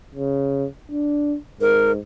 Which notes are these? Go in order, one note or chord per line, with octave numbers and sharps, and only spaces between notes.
C#3
D4
G#2 A#4